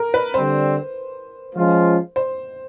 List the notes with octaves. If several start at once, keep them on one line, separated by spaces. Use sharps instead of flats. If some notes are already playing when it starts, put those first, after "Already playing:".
Already playing: A#4
B4
D3 G3 C4 C5
F3 G#3 C#4 F4
C5